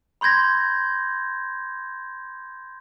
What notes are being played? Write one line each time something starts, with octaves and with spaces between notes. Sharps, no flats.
B5 C6 G6 G#6 A#6